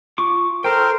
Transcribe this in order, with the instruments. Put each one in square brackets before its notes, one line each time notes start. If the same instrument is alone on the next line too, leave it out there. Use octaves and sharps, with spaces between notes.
[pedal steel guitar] F4 C#6 D6
[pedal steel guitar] A4 G5 [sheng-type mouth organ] A#4 C5